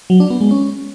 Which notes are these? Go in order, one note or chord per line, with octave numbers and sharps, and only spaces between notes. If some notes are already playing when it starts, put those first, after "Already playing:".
F#3
D4
B3
G#3
C#4